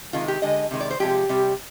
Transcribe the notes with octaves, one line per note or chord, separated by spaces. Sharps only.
C3 D#3 G#3 F4
G4
D3 G#3 D#5
C3 D#3 G#3
D5
C5
C3 F3 G#3 G4
C3 G3